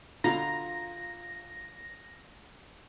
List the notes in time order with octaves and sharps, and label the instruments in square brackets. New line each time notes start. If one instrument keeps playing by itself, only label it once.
[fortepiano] B2 D3 [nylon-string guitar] F4 [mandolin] A#5 [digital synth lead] A#6